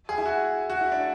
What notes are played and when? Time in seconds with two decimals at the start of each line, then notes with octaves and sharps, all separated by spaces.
0.09 G#4
0.18 E4
0.26 F#4
0.70 F#4
0.81 E4
0.92 D4